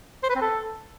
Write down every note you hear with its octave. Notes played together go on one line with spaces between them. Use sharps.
C5
B4
C4
A4